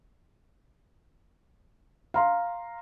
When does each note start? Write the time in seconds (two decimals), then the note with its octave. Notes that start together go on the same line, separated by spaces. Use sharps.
2.14 F5 A#5 C6